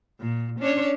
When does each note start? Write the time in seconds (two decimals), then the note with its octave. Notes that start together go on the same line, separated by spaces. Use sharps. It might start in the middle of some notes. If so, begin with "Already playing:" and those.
0.20 A#2
0.60 C#4 D4 C#5